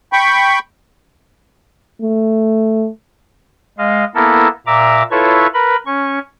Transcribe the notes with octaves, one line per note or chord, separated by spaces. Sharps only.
G5 B5 C#6
A3
G#3 D#5 F5
A#3 B3 E4 A4 A#4
A#2 E5 A#5 D6
E4 F4 A4 B4 C#5 C#6
A#4 B4 B5
C#4 C#6